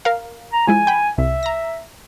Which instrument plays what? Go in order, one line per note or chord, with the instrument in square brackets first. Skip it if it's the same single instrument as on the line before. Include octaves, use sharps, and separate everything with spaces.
[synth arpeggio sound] A#4 F5
[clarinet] A#5
[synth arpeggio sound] F3 G#3 E4 [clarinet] G#5
[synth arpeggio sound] G5 B5
[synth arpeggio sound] C2 [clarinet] E5
[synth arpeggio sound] A#5 A#6